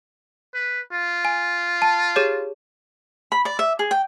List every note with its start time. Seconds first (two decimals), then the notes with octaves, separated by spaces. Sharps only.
0.54 B4
0.93 F4
1.25 G#5
1.82 A5
2.16 G4 G#4 C#5
3.32 B5
3.45 D5
3.59 E5
3.79 G#4
3.91 G5